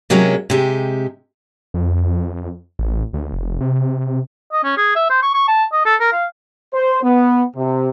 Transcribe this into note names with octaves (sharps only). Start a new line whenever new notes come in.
C3 F#3 G#3 A#3 C#4 F#4
C3 G#3 G4
F2
A1
D2
F1
C3
D#5
C#4
G#4
E5
C5
C#6
C#6
A5
D#5
A4
A#4
F5
C5
B3
C3